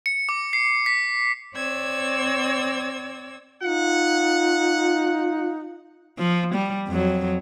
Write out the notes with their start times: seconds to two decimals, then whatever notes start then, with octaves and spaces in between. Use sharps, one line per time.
0.06 C#7
0.29 D6
0.53 C7
0.86 B6
1.55 C4 C#5 D5 E6 G#6
3.63 D#4 F4 F#5
6.18 F3
6.55 G3
6.88 F2 F#3